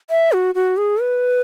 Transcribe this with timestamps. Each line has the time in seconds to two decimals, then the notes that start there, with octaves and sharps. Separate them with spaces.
0.10 E5
0.32 F#4
0.55 F#4
0.77 G#4
1.01 B4